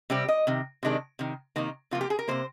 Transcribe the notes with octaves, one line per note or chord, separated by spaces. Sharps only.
C3 G3 C4 G4
D#5
C3 D#3
C3 D#3 G#3 D4
C3 D#3
C3 D#3 A#3 D#4
C3 F3 A#3 F4
G4
G#4
A#4
C3 F3 A#3 C5